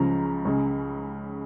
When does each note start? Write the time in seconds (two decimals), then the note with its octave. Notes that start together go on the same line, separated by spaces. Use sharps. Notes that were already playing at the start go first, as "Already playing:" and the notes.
Already playing: C#2 C#3 F3 A#5
0.45 C#2 C#3 G#3